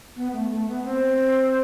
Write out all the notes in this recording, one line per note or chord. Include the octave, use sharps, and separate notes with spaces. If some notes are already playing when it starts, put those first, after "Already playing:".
B3
A3
A3
B3
C4